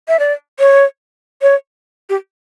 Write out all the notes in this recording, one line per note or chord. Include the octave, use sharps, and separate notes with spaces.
E5
D5
C#5
C#5
G4